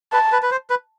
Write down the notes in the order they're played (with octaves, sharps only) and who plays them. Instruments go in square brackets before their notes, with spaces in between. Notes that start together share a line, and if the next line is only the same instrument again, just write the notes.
[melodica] B4 [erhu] A5
[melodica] B4
B4
C5
B4